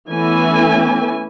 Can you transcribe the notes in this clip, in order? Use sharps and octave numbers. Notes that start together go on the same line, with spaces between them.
E3 A3 B3 C#4 E4 G#5